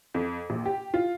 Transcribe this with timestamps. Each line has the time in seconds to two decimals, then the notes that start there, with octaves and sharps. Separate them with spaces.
0.14 F2
0.50 A#1
0.66 G4
0.94 F4